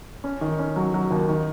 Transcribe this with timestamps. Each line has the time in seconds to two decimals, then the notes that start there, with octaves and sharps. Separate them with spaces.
0.24 C#4
0.41 D#3
0.59 C#4
0.76 F#3
0.94 F#3
1.11 D#2
1.29 D#3